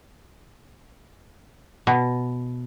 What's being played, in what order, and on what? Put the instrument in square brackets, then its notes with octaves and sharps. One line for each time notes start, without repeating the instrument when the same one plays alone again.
[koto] B2